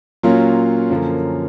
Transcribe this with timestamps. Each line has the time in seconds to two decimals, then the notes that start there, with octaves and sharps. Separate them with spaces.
0.23 A#2 F#3 A#3 C#4 F4
0.90 F#2 D3 F3 A#3 C#4